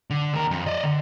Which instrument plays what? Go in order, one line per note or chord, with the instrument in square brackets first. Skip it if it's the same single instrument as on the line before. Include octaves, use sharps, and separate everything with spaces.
[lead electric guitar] D3
D#2 A#4
F2
D5 D#5
D3